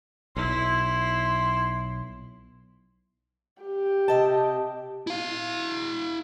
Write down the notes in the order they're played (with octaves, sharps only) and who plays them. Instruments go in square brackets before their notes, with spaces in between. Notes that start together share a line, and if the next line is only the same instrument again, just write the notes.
[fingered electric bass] B1 [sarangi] E4 [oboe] C6
[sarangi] G4
[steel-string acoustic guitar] C3 D#5 A5
[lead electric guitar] E4 F5